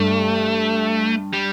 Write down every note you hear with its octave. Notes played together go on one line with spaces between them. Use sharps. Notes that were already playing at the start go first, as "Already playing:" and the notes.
Already playing: G2 A3
G3